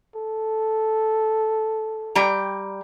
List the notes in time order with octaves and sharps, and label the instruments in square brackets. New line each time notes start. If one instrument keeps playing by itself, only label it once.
[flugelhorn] A4
[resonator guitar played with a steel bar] G3 G4 A#5